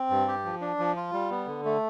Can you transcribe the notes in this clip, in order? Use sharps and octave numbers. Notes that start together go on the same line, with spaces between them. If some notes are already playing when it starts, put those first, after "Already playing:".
Already playing: C4
G2
G4
F3
D4
F3
F4
G3
B3
D3
A3